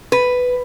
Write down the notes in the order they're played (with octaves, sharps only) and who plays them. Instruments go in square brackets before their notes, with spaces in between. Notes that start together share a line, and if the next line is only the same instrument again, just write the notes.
[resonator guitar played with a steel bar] B4